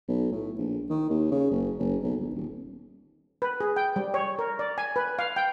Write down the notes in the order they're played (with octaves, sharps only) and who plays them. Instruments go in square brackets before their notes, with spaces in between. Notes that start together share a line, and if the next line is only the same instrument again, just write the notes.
[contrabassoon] B1
A2
A#1
D#3
D#2
C#3
F#1
F#1
B1
G1
D#1
[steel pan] B4
G#4
G5
G3
C#5
A#4
D5
G#5
B4
F5
G5